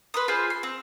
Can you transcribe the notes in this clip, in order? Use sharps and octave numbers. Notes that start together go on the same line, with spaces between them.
B4 C6 D#6
F4 G#4 B4 C5
C6
C4